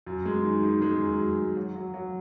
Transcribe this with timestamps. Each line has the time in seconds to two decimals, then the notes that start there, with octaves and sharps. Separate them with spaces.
0.06 F#2
0.25 G#3
0.44 D#3
0.63 D#3
0.82 G#3
1.00 F#2
1.19 F#2
1.38 G#3
1.57 F#3
1.76 F#3
1.94 F#3